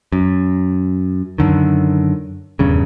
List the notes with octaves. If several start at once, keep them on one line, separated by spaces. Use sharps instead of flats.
F#2
F#2 D3 D#3
D#1 E2 G2 C#3